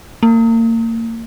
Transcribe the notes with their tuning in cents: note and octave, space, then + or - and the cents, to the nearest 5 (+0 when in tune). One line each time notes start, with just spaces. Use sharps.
A#3 -35